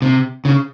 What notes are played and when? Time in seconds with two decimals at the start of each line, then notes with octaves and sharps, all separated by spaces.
0.02 C3
0.45 C#3